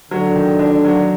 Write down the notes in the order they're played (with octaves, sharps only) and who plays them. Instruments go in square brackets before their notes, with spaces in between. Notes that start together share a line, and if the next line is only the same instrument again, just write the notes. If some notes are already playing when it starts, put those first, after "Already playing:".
[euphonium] D3 [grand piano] F#3
[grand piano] D#3
D4
F#3